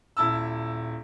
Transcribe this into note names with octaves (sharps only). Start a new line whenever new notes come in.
D#1 E4 A5 E6